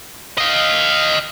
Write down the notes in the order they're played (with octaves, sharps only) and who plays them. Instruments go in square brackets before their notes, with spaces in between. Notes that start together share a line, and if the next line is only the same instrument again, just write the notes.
[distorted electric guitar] D#5 F5